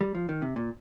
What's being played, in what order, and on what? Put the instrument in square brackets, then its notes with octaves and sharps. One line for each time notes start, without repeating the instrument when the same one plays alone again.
[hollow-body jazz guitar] G3
F3
D#3
C3
A#2